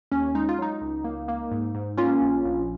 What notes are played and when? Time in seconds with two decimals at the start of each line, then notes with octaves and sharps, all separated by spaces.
0.12 D#2 C#4
0.35 G#3 D#4
0.49 F4
0.58 F#3 D#4
0.81 C#2
1.04 A#3
1.28 A#3
1.51 G#2
1.75 G#2
1.97 A#3 C#4 F4
2.21 A#1
2.45 A#1